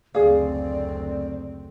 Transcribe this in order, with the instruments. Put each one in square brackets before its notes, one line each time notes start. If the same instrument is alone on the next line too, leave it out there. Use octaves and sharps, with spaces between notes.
[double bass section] F#1 D2 C4 [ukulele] G#4 F5 [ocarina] D5